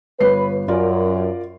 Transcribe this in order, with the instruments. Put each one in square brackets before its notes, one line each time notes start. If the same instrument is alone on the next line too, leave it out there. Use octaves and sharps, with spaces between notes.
[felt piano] G1 C#5 C7 [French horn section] B4
[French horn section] F#2 [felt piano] F4 A#4 D5